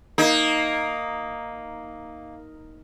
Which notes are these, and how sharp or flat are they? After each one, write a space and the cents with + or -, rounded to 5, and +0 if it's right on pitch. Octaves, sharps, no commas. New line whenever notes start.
A#3 +0 D#4 +5